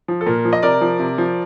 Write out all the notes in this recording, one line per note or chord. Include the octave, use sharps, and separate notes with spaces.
F3
A4
A#2 A#4
F3
D#5
C3 A#4 D5
F3
C3
F3